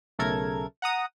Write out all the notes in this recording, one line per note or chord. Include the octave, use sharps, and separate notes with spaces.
B1 C#3 A3 A4 A#4 G#6
F#5 A#5 D#6